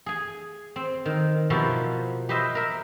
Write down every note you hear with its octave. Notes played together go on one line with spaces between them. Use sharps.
G#4 G#5
C4
D#3
B2 F3 A#3 E4 F#4 G4
G4 B4 C5 D#5 E5
A#4 E5